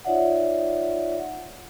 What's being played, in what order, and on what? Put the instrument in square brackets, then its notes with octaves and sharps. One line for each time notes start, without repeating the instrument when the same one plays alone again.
[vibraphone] D#4 F4 C#5 D5 E5 F#5